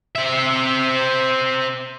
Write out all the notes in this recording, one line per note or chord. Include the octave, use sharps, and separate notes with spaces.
C4 E5